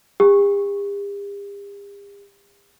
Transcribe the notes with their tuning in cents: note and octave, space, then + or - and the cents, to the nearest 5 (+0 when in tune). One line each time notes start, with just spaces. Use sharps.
G4 +45